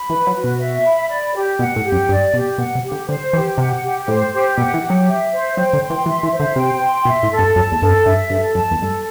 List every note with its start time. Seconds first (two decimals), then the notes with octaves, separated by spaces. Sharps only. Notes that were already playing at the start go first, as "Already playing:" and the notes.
Already playing: B5
0.10 E3 B4
0.27 F#3
0.35 F#4
0.44 B2
0.59 E5
0.84 B5
1.09 D5
1.34 G4
1.59 B2 F#5
1.76 A2
1.84 G4
1.92 F#2
2.09 G2 D5
2.34 B2 G4
2.58 B2 F#5
2.75 C3
2.84 G4
2.92 D3
3.08 D3 C5
3.33 E3 G4
3.58 C3 F#5
3.82 G4
4.08 A2 C5
4.33 G4
4.58 B2 F#5
4.74 E3
4.82 G4
4.90 F#3
5.08 E5
5.32 C5
5.57 F#3 G5
5.73 D3
5.82 C6
5.90 E3
6.06 E3 E5
6.23 E3
6.32 C5
6.40 D3
6.56 C3 G5
6.81 C6
7.05 B2 E5
7.23 A2
7.31 A4
7.39 G2
7.55 F#2 A5
7.72 E2
7.80 G2 A4
7.88 F#2
8.05 G2 E5
8.29 G2 A4
8.55 F#2 A5
8.71 E2
8.80 G2 A4